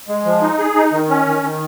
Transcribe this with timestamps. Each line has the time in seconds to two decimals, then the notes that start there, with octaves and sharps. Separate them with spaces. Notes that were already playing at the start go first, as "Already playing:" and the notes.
0.08 G#3
0.25 F3
0.42 D#4
0.59 G#4
0.75 D#4
0.92 D#3
1.09 C#4
1.26 D#3
1.42 D#3